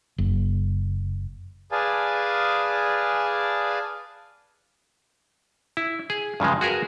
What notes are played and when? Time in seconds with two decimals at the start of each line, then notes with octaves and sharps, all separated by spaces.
0.18 F#1
1.72 G#4 B4 D5 F5 G#5 A5
5.77 E4
6.10 G#4
6.40 G2 C#3 F3 G#3
6.61 F#4 G#4 A#4 B4